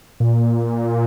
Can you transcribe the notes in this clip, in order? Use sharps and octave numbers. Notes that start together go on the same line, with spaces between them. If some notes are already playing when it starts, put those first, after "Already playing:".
A#2